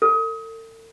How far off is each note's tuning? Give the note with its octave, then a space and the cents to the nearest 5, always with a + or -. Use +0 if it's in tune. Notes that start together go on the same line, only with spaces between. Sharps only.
A4 +45